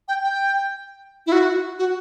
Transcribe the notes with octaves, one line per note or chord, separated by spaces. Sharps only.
G5
G5
E4
F#4
F#4